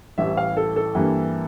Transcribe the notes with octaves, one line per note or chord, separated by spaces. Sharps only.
A1 A2 G3 E5
F5
A4
A4
G2 E3 G3 A#3